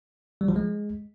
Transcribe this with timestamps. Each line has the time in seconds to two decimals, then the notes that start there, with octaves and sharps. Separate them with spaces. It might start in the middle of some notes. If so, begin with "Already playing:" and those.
0.41 G3
0.48 F3
0.56 G#3